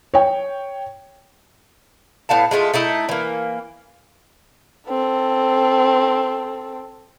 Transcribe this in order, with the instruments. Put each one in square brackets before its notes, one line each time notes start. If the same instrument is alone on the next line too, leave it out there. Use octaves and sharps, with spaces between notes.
[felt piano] C#5 G5
[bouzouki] A2 B3 F5 A5
G#3 A3 E4 F4
A3 D#4 E4
E3 A#3
[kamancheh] C4 A4